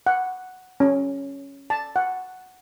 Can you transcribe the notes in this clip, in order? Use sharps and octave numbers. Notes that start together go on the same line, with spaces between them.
F#5
C#4
A5
F#5